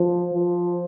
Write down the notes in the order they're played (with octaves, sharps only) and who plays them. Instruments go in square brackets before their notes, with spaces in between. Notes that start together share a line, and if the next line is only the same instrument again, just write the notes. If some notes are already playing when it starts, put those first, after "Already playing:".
Already playing: [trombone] F3
F3